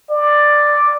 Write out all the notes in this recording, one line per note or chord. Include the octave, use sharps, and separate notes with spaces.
D5